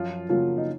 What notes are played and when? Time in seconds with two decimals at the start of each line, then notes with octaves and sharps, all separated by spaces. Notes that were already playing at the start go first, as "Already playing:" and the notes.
Already playing: F#2 F3 F4
0.29 C#3 F3 F#3 A#3 F4
0.58 D#4